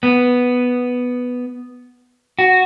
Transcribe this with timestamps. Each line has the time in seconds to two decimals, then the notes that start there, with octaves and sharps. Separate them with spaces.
0.03 B3
2.39 F#4